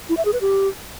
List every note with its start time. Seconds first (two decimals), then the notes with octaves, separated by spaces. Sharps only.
0.09 E4
0.17 E5
0.25 G#4
0.33 B4
0.41 G4